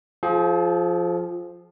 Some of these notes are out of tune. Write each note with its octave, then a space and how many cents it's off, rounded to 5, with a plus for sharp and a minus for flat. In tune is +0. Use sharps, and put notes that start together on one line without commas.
F3 +0 G#4 +45 G5 +0